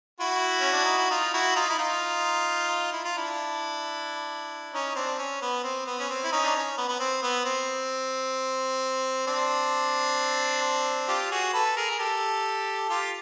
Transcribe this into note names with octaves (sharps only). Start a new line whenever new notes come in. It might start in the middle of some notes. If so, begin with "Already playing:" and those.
E4 F#4
C#4
D4
D#4
E4
D#4 F4
E4 F#4
D#4 F4
E4
D#4 F4
E4
F4
D4 E4
C#4 D#4
C4 D4
C#4
B3
C4
B3
C#4
C4
E4
C#4 D#4
D4
C#4
B3
B3
C4
B3
C4
C4 D4
F4 G4
F#4 G#4
A4 B4
G#4 A#4
G#4
G4 A4
F4 G4